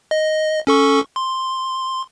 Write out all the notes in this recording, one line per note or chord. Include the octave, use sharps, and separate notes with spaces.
D#5
C#4 A4 C#6
C6